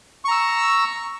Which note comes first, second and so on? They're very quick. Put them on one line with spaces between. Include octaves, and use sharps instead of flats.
C#6 A#5 E6